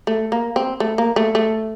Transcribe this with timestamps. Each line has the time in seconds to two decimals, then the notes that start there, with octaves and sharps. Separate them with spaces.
0.07 A3
0.32 A#3
0.56 C4
0.80 A3
0.98 A#3
1.16 A3
1.35 A3